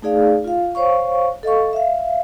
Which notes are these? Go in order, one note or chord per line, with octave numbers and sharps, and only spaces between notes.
A3 D#4 G#4 D5 F5
F4 F5
C5 C#5 F5 C#6
A4 D#5 F5 C#6
E5 F5